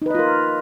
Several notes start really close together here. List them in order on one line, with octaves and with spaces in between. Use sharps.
D#4 B4 D#5 F4 A#4